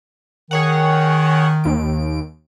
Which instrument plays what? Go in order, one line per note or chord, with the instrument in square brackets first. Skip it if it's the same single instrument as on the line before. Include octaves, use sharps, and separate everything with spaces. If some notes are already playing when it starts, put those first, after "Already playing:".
[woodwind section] D#3 [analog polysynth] G#4 C#5 F#5
[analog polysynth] D#2 D7